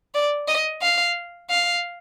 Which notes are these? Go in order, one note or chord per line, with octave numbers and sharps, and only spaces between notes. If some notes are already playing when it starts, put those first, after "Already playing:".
D5
D#5
F5
F5